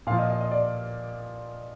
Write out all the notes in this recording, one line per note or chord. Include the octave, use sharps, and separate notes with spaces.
A#2 F3 F5
D#5
D#5
D#5
D5